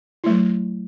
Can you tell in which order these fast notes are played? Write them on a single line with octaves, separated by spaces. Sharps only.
E4 A3 F#3